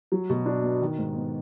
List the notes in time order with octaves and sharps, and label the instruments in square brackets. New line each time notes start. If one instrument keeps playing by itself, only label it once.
[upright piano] F#3
B2
D4
B3
D#3
G#2
B3